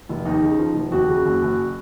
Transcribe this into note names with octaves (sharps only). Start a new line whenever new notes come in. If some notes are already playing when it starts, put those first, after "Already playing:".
F1
D#2 D#4
C#3
F3
F1
D#2 F#4
C#3
F#1
F#1